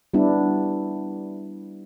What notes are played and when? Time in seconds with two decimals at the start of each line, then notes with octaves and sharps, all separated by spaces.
0.14 G3 B3 D4 E4